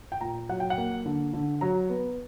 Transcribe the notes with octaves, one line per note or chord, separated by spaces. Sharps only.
G5
A#2 A#5
F#3 F#5
G5
F#5
A#3
D3
D3
F#3 A#5
B3